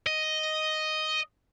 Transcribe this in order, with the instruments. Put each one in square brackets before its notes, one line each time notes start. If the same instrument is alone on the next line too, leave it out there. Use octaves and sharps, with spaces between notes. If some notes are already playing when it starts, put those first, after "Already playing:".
[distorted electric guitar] D#5